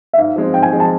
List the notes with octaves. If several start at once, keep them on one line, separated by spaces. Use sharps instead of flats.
E5
G#2 F5
F3 G#3 C4
G#2 G5
G#5
F3 G#3 C4
A5